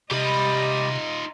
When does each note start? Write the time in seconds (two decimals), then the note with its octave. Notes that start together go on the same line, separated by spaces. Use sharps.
0.11 C3 D#4 F4 G4 D#5 B5